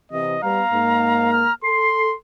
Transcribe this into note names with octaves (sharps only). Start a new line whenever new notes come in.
C3 E3 D#5
G3 B3 F5 A#5
G#2 A#3
F6
A4 C6 C7